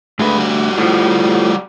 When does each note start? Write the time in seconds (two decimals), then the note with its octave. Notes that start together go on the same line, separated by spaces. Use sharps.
0.19 D2 G#3 B4
0.38 G3 F#4
0.78 A2 F3